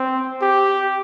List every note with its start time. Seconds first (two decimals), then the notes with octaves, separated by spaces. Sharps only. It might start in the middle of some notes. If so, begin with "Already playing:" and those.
Already playing: C4
0.41 G4